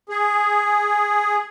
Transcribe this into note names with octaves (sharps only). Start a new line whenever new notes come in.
G#4